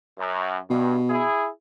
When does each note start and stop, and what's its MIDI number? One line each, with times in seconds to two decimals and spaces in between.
0.19 0.60 42
0.70 0.96 43
0.70 1.24 47
1.10 1.48 64
1.10 1.48 68